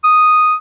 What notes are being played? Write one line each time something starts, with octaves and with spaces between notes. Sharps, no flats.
D#6